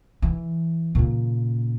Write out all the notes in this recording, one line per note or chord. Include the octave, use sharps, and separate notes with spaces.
E3
A#2 C#3